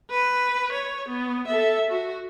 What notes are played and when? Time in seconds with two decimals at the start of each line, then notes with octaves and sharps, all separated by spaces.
0.10 B4
0.72 C#5
1.08 B3
1.47 A4 E5
1.91 F#4